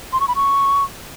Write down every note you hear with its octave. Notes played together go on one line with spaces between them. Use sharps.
C6
C#6
B5
C#6